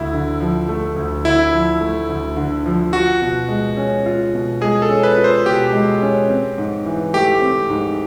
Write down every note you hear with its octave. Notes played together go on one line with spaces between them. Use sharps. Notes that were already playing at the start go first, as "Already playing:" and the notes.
Already playing: D2 A3 E4
D3
F3
A3
D2
D3 E4
F3
A3
D2
D3
F3
F4 F#4
B2
G#3
C#4
F4
B2
G#3 G#4
A4
C#4
B4
F4
C5
B2 G4
G#3
C#4
C4
G#2
E3
A3 G4
C4
G#2